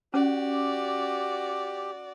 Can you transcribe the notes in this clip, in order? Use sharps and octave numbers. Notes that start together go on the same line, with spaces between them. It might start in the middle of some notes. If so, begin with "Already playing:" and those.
C#4 F#4 G4 D5